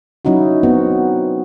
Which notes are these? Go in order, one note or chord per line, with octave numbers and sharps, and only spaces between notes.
F#3 C#4 D#4 E4 F#4
B3 C4 F#4